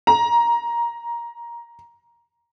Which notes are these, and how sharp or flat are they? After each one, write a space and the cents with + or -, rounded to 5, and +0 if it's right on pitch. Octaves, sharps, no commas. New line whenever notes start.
A#5 +15